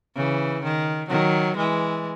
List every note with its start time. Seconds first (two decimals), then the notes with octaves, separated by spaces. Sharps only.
0.16 C#3 E3
0.63 D#3
1.09 D#3 F#3
1.57 E3 G#3